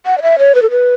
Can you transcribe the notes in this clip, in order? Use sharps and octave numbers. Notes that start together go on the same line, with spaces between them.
F#5
D5
E5
C#5
B4
A4
B4